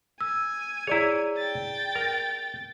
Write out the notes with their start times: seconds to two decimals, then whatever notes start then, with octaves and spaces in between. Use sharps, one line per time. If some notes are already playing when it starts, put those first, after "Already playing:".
0.21 G#5 E6
0.87 E4 G#4 C#5 D5 A#5
1.37 G5 A6
1.95 A#4